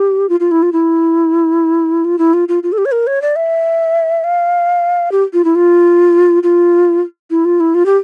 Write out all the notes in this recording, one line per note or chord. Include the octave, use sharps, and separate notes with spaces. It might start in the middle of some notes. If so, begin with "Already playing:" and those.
Already playing: G4
F4
F4
E4
F4
E4
F4
E4
F4
F4
F4
A4
G4
C#5
A#4
C#5
D5
E5
F5
G4
F4
E4
F4
F4
E4
F4
E4
F4
G4